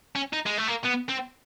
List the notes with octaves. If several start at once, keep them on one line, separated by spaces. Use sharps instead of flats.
C#4
D#4
G#3
A3
A#3
B3
C4